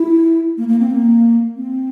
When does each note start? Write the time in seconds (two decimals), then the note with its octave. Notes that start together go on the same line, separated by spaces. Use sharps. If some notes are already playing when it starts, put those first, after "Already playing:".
Already playing: E4
0.57 A#3
0.68 A#3
0.80 C4
0.91 A#3
1.56 C4